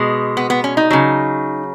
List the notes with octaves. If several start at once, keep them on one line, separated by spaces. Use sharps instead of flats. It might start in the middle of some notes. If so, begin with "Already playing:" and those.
Already playing: B2 G#3
B3
B3
C#4
D#4
C#3 F#3